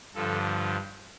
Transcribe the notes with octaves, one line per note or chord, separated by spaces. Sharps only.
G2 D3 F3 A4